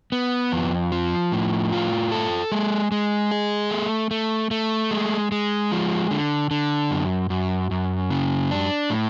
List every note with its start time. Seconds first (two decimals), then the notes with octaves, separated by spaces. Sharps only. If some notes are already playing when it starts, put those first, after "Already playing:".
0.12 B3
0.52 F2
0.92 F3
1.32 A2
1.72 F4
2.12 A4
2.52 G#3
2.92 G#3
3.31 G#4
3.71 A3
4.11 A3
4.51 A3
4.91 G#3
5.32 G#3
5.72 F3
6.11 D3
6.51 D3
6.91 F#2
7.30 F#2
7.71 F#2
8.10 C#3
8.51 D4
8.90 A2